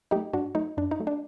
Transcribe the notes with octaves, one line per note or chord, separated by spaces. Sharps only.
F#3 A3 D#4 G4
G2 D4 F#4
F#3 A3 D#4
F#2 D4
D#4
F#3 A3
D4